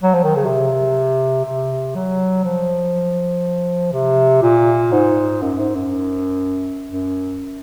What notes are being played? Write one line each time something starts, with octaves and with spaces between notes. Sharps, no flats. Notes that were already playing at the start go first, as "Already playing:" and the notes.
F#3
F3
D#3
C#3
C3
C3
F#3
F3
C3
A#2
G#2
F#2
G#2
F#2
F#2